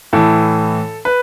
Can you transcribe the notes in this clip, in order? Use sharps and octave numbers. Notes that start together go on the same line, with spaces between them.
A2 E3 A4
B4